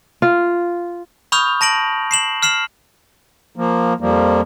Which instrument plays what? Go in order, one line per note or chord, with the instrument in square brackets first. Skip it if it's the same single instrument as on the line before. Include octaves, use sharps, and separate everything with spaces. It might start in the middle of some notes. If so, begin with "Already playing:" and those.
[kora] F4
[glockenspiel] B5 C#6 D#6 F6 G6 F7
A5 A#6 D7 F#7
C7 E7 F#7
F6 C7 E7 F#7
[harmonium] F3 A#3
F2 F3 G3 A#3